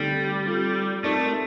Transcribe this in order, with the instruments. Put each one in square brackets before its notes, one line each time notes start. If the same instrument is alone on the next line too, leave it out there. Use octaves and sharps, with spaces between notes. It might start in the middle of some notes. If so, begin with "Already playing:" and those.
Already playing: [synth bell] D3 A3 C4 D#4 A4 [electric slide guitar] G3
[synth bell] C4 F4 A4
[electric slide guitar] A3 [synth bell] C4 D#4 A#4 D5